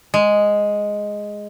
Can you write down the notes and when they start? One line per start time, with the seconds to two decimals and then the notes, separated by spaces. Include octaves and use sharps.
0.14 G#3